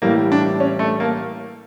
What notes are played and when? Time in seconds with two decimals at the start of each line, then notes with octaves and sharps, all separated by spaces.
0.02 A2 E3 G3 A#3
0.32 D4
0.60 C#4
0.79 A3
1.00 A#3